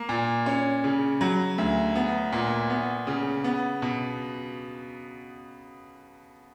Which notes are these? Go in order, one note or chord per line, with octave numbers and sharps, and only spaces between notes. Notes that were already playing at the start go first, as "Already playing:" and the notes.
Already playing: A#3
A#2
C#4
C#3
F#3
D2
B3
A#2
B3
C#3
B3
B2